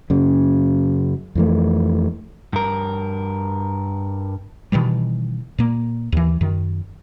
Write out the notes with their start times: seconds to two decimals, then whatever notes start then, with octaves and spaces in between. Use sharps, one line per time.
0.10 F#2 C#3
1.35 F2 E3 A3
2.53 G2 A#4
4.72 B2 D#3 E3 G3
5.58 A#2 A#3
6.12 D#2 E3
6.41 F#2 D#3